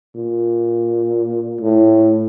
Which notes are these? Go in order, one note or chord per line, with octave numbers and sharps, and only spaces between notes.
A#2
A2